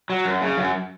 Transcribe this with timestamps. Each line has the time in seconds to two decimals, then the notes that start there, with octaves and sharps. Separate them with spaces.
0.10 F#3
0.25 F#2
0.42 C#3
0.58 F#2